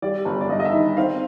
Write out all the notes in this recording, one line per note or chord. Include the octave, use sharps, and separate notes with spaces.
G3 D5
G1
D5
G2 D#5
D#5
E5
D#3
C4 F5